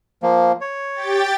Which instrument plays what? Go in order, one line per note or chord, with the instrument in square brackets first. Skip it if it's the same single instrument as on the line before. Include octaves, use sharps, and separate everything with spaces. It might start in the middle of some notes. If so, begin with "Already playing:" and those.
[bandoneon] F3 A#3
C#5
[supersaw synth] G4 G5 A6